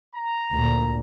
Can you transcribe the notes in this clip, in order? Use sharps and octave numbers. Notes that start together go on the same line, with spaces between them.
A#5
D2 A#2